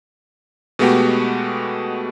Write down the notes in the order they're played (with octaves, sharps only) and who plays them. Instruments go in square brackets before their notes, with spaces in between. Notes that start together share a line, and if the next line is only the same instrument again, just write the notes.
[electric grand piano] B2 G#3 A3 B3 F#4 G4